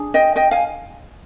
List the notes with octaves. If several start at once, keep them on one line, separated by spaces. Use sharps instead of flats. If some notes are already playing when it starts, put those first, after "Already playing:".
Already playing: D4 G#4
D#5 G5
D#5 G5
F5 G#5